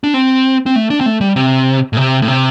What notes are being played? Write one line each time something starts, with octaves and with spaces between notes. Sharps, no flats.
D4
C4
C4
A3
D4
C4
A3
G3
C3
A2
C3
A2
C3